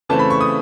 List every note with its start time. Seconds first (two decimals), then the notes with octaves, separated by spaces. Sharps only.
0.09 C#3 E3 A3 C4 A5
0.19 B5
0.30 C#6
0.41 D#6